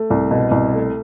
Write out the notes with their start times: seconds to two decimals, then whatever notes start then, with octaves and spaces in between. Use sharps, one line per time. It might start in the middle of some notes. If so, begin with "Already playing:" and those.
Already playing: A3
0.10 C2
0.31 B2
0.51 C2
0.73 A3